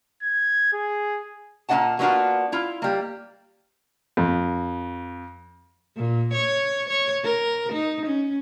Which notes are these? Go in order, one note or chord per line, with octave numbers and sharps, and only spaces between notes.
G#6
G#4
A#2 A#3 D4 D5 F#5 A5
F#3 A#3 B3 D4 F4 F#4
E4 F4
G3 A#3
F2
A#2
C#5
C#5
A#4
D#4
C#4